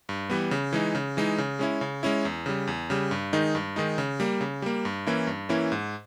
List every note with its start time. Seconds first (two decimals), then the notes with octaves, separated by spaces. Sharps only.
0.09 G2
0.30 E3 G3 B3
0.51 C#3
0.73 E3 G#3 D#4
0.95 C#3
1.17 E3 G#3 D#4
1.38 C#3
1.59 G#3 C#4 E4
1.81 C#3
2.03 G#3 C#4 E4
2.25 E2
2.46 C#3 G3
2.67 E2
2.90 C#3 G3
3.11 G2
3.33 D#3 G#3 D#4
3.55 G2
3.76 D#3 G#3 D#4
3.98 C#3
4.20 G3 A#3
4.41 C#3
4.62 G3 A#3
4.85 G2
5.07 E3 A#3 C#4 E4
5.27 G2
5.49 E3 A#3 C#4 E4
5.72 G#2